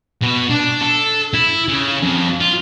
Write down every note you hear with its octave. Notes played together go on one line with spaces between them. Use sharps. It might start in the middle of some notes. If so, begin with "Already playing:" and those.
B2
D4
A4
E4
C#3
F2
F4